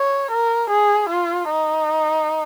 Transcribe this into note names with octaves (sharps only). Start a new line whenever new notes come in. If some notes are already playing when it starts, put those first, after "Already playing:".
Already playing: C#5
A#4
G#4
F4
D#4